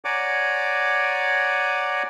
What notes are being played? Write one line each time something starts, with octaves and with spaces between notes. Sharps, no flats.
C#5 D5 F#5 G#5 A#5 D6